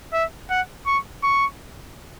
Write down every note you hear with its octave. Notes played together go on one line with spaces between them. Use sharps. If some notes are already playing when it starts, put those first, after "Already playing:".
E5
F#5
C#6
C#6